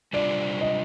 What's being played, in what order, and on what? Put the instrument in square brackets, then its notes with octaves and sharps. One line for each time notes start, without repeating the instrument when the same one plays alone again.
[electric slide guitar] C3 G3 D4 F4 C5 [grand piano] D5
[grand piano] D#5